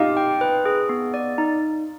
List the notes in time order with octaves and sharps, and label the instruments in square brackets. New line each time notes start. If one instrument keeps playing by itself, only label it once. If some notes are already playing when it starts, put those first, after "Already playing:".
Already playing: [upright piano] D#4 F4 [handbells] G4
[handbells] G5
B4
G#4
B3
D5
D#4